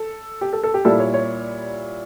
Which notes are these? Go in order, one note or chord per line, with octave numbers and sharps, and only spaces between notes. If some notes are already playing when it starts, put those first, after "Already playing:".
Already playing: A4
G4
A4
A4
G4
A#2 G3 A#3 E4 A4
C#5
C#5